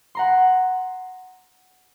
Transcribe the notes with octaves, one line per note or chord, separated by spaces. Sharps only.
F#5 A#5 C6